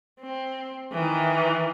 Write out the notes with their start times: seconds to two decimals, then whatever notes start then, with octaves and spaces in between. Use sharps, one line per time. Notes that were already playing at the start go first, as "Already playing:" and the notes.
0.20 C4
0.93 D#3 E3